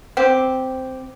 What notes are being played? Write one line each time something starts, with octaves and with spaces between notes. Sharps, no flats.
C4 G4